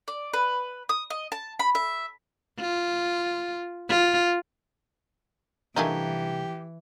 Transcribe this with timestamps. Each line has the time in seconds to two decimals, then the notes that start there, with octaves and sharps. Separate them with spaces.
0.08 D5
0.33 B4
0.89 D#6
1.10 D#5
1.32 A5
1.59 B5
1.75 E5
2.60 F4
3.89 F4
5.76 C2 E3 A3 A#3 D4 D#4 G4 G#5